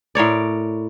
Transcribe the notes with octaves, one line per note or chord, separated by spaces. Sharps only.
A2 A#4 C#5 D5